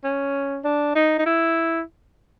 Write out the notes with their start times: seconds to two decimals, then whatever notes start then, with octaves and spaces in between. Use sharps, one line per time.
0.04 C#4
0.65 D4
0.95 D#4
1.19 D#4
1.26 E4